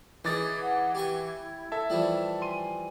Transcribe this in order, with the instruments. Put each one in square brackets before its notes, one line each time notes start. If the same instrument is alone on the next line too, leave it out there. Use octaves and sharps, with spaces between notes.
[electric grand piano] E3 D6 A6 [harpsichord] C#4 D#4 G#4
[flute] F#5
[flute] E4 [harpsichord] G4 G#5 C#6
[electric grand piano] A4 E5 A5
[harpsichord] E3 F3 G3
[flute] G#5 [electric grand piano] C6 D#7